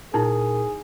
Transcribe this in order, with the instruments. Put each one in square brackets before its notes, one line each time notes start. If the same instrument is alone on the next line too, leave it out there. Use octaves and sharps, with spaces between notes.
[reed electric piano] A#2 A#4 [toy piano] D#4 E4 [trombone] G#4